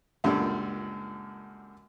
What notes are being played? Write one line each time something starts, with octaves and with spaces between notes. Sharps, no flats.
C#2 F#2 A#2 D3 G3